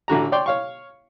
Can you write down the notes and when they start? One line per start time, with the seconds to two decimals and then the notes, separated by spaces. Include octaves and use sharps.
0.08 A1 D3 F#4 A#5
0.32 C#5 D5 G5 C6
0.46 C#5 F5 C#6